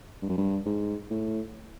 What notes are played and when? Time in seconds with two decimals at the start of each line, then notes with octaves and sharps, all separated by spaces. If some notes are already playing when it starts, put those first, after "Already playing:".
0.22 G2
0.29 F#2
0.38 G2
0.66 G#2
1.10 A2